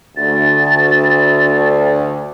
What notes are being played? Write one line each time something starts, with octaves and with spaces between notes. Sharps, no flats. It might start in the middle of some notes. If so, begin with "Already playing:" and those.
D2 A6